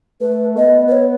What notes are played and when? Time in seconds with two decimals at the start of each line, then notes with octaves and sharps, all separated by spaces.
0.21 A3 B4
0.56 B3 D#5
0.88 B4
0.92 C#5